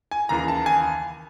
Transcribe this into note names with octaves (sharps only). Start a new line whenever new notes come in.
G#5
D#2 C#3 E3 A#5
A5
G#5